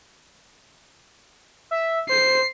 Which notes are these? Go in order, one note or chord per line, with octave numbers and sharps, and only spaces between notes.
E5
C5 C7